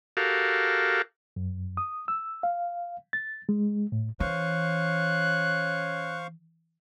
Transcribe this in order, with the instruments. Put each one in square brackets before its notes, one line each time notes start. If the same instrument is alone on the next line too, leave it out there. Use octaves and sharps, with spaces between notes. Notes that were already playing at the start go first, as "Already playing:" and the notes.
[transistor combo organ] F#4 G4 A4 A#4 F5
[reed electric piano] F#2
D#6
E6
F5
A6
G#3
A2
[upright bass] E3 [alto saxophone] C#4 [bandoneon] C5 F5 C#6 [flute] F#6